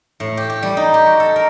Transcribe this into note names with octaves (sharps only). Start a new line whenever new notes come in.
A2
G4
G4
G3
D#4
G4
F#4
A4
A#4